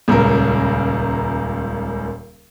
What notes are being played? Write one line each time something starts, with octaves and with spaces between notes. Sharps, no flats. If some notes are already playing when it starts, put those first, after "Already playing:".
D#1 C#2 C#3 A#4